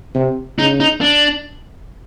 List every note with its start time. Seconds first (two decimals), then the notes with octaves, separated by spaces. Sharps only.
0.15 C3
0.58 C#3 D#4
0.80 D#4
1.01 D4